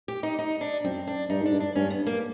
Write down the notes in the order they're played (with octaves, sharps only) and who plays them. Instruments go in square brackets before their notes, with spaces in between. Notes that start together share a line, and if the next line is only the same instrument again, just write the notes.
[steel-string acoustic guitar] G4
D#4
D#4
D4
[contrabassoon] F#2 [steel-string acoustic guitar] C4
[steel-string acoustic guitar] D4
[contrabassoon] G2 [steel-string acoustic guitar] D#4
[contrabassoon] G#2 [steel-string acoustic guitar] D4
[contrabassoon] G2
[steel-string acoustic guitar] D4
[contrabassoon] G2 [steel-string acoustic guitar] C#4
[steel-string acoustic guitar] B3
A#3